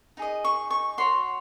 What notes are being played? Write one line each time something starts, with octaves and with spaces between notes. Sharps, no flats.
D#4 G#4 D#5
C#6
C#6
F#4 C#5 C6